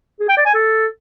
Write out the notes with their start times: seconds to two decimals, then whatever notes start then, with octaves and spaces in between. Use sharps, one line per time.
0.20 G#4
0.28 G5
0.37 D5
0.45 G#5
0.54 A4